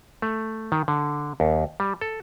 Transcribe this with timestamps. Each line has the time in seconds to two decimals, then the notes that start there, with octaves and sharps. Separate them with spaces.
0.22 A3
0.72 D#3
0.88 D3
1.40 D#2
1.80 G3
2.01 A4